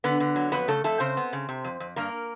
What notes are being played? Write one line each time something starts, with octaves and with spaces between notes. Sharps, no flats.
D3 B3 B4
D3
F#3
F2 B3 B4
C#3 A3 A4
F2 A3 A4
C#3 C4 C5
B3
C#3
C3
F2
F2
G2 A#3 A#4